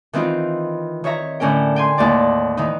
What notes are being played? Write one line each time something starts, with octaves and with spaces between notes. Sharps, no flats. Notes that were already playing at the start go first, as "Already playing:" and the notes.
D#3 E3 C4 D#4 F4
D#3 C#5 E5 A#5
A2 D3 C#4 A#4 G5
G5 G#5 C6
D#2 A2 D5
D#3 E3 D#4